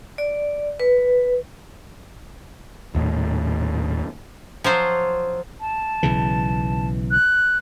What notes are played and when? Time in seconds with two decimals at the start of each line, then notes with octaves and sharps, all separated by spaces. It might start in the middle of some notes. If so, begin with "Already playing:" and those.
0.18 D5
0.80 B4
2.95 D#1 D#2 A2
4.64 F3 F#3 C5
5.60 A5
6.03 B1 C#3 E3
7.11 F#6